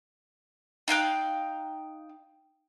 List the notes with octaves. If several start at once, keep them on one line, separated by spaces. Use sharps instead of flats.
D#4 F5 G5 F#6